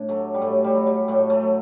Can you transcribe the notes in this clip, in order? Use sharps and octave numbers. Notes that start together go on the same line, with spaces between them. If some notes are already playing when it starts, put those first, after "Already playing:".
Already playing: A2 D4
F#3 A3
G3
A2 A3
G3
F#3
G3
A2 A3
A3
F#3